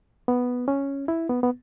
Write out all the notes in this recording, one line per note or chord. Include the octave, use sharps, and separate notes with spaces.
B3
C#4
E4
B3
B3